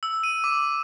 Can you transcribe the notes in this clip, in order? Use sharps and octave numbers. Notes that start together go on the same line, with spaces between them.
E6
D#7
D6